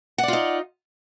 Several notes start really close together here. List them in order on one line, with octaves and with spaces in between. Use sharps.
F#5 D5 F4 D#4